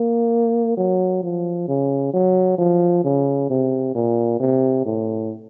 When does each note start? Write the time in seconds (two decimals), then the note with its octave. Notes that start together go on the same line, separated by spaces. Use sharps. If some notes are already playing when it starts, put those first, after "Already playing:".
Already playing: A#3
0.77 F#3
1.23 F3
1.68 C#3
2.14 F#3
2.58 F3
3.04 C#3
3.50 C3
3.95 A#2
4.40 C3
4.86 A2